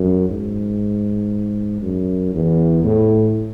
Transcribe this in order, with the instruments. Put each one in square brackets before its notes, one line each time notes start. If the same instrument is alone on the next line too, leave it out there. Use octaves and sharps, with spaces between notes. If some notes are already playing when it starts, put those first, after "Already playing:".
Already playing: [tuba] F#2
G#2
F#2
E2
A2